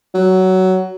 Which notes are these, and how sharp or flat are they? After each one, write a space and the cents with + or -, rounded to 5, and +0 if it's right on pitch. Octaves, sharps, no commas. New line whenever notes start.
F#3 +15